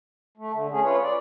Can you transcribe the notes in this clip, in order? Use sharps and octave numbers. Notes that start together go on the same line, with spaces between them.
A3
D3
A3 C#4 G#4
F4 B4 C#5
D5